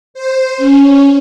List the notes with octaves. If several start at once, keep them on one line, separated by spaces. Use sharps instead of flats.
C5
C#4